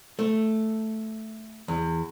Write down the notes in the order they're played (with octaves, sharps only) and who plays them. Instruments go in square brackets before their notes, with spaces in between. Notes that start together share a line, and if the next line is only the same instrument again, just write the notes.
[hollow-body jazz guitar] A3
E2